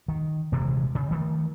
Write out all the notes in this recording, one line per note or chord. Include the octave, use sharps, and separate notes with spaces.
D#3
D#1 C3 E3 G#3
C#3
D#3 F3 A3